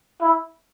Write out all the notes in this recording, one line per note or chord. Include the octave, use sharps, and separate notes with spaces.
E4